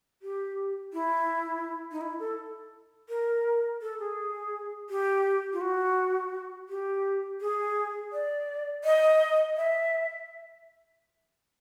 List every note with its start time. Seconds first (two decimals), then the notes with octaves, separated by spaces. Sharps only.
0.22 G4
0.93 E4
1.92 D#4
2.01 E4
2.19 A4
3.09 A#4
3.82 A4
4.00 G#4
4.90 G4
5.53 F4
5.61 F#4
6.69 G4
7.41 G#4
8.13 D5
8.84 D#5
9.57 E5